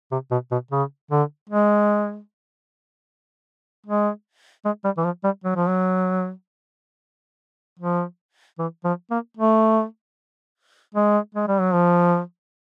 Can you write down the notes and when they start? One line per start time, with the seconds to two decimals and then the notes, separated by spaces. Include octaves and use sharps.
0.11 C3
0.31 B2
0.51 B2
0.71 C#3
1.11 D3
1.49 G#3
3.86 G#3
4.65 G#3
4.84 G3
4.97 E3
5.04 F3
5.23 G3
5.44 F#3
5.55 F3
5.67 F#3
7.79 F3
8.58 E3
8.84 F3
9.10 A#3
9.37 A3
10.94 G#3
11.34 G#3
11.48 G3
11.60 F#3
11.73 F3